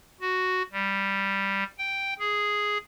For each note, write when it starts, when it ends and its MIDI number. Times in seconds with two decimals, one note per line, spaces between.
0.21 0.62 66
0.73 1.64 55
1.78 2.14 79
2.19 2.78 68